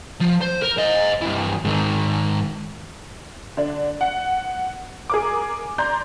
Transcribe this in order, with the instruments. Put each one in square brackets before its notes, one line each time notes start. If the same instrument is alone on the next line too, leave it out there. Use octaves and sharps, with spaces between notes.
[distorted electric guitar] F3
C5
A#4
C5 D#5
G2 E3
G#2 D#3
[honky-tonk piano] D3 D4
F#5
G#4 A#4 D6
D5 A#5 C6 G6